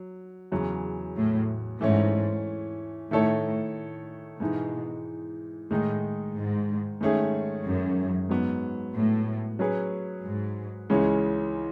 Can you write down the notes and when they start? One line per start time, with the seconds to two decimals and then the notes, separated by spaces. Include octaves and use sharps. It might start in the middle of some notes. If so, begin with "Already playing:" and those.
Already playing: F#3
0.52 E2 C#3 F#3
1.16 A2
1.81 G#2 E3 A3 C#4
3.11 A2 D#3 A3 E4 A4 C#5
4.40 G#2 B2 E3 G#3 D#4
5.70 A2 D#3 G#3 D#4
6.36 G#2
7.01 G#2 D#3 A3 C#4 G#4
7.65 F#2
8.29 G#2 F#3 B3
8.95 A2
9.59 F#3 C#4 G#4 B4
10.24 G#2
10.90 C#2 C#3 E3 G#3 C#4